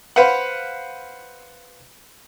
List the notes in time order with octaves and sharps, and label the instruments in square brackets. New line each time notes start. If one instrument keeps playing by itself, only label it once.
[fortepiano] B4 C5 F5 F#5